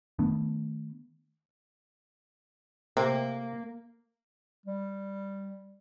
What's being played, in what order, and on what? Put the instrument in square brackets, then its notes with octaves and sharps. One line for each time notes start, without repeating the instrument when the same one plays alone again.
[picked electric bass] D#3 A3 B3 D4
[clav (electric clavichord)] C3 [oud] A#3
[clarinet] G3